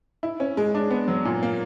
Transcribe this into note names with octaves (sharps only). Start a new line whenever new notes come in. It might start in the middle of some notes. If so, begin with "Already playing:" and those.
E4
C#4
G#3
D4
B3
F#3
A#2
A#3